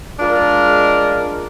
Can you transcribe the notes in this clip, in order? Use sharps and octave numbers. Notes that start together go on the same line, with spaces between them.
G#3 D4 F4 A#4